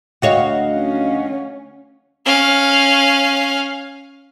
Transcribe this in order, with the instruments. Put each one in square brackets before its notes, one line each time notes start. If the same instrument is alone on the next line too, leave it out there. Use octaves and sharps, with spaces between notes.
[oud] D2 F#4 C#5 [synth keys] D#5 F5 F#5
[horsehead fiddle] C#4
[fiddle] C#4 F5